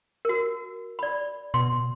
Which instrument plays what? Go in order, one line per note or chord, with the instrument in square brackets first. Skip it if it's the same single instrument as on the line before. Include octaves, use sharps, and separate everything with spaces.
[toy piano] F#4 A#4
D5 B5
[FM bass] B2 [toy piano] C6